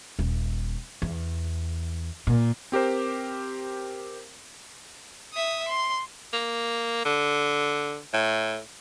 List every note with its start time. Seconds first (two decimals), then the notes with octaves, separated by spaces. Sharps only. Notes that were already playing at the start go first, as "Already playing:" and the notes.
0.19 D#1
1.02 E2
2.27 A#2
2.72 C4 G4 A#4 C5
5.33 E5 D#6
5.68 C6
6.33 A#3
7.05 D3
8.14 A2